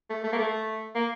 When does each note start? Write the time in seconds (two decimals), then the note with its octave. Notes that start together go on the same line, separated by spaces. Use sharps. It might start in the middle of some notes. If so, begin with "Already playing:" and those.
0.09 A3
0.23 A3
0.32 A#3
0.38 A3
0.95 A#3